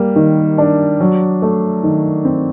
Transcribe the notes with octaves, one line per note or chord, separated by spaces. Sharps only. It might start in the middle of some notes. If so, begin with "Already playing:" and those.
Already playing: G3 A#3
D#3
D4
F#3
A3
D#3
C4